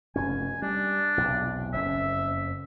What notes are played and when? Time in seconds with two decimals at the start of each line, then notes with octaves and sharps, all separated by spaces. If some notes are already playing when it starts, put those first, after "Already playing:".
0.16 F1 F#2 C#4 G#5
0.62 G3 D4
1.18 B1 E2 C3
1.73 F#1 F2 C#4 E5